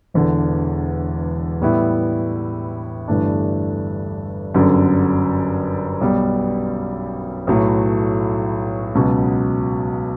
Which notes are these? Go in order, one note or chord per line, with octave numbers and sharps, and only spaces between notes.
E1 E2 D3
A2 G3 B3 E4
G1 G2 E3 A3 D4
G1 F#2 D3 F#3
B1 B2 G3 B3
B1 A2 F#3 A3
C#2 B2 F#3